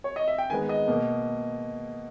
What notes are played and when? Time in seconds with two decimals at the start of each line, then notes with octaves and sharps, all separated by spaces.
0.04 C#5
0.16 D#5
0.28 E5
0.38 G5
0.50 D#3 G#3 B3 G#5
0.69 D#5
0.88 B2 A#3